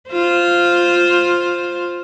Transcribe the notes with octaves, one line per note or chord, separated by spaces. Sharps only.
F4 C5